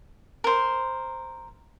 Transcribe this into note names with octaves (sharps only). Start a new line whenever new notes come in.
A#4 C5